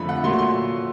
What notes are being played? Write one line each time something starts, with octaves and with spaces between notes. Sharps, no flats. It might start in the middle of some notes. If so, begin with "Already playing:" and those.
Already playing: F2 D3 F3 A3 B5
F#5
A#2 F#3 A3 C6
C#6
C6